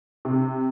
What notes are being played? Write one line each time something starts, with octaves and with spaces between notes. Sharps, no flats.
C3